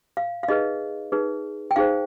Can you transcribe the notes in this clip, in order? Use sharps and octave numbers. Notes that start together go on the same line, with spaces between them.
F5
F5
D#4 G#4 B4 D#5
D#4 G#4 B4
G5
D#4 G#4 C5 F5